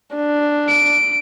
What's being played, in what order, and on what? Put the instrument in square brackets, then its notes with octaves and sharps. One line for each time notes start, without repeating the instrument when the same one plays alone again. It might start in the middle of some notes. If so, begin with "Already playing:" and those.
[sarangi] D4
[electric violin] D7